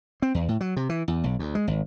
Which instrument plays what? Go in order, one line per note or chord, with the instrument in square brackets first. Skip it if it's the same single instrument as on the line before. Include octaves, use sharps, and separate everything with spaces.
[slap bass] C4
E2
A2
F#3
C3
E3
E2
B1
D2
G#3
G#1